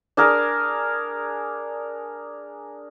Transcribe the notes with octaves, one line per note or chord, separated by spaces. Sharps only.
D4 G#4 A#4